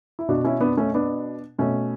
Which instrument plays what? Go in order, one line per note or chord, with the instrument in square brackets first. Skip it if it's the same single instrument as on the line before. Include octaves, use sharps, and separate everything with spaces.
[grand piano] E4
B2 D4 F#4
C#4 E4
B3 D4
A3 C#4
B3 D4
B2 A3 C#4